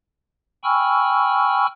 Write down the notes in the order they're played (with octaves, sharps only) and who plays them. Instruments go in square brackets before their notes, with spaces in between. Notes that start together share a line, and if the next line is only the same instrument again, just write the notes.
[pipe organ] G5 G#5 B5 C#6 E6 F6